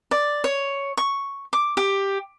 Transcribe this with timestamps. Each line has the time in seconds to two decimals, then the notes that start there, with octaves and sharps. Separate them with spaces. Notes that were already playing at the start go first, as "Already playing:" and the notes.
0.11 D5
0.44 C#5
0.97 C#6
1.53 D6
1.77 G4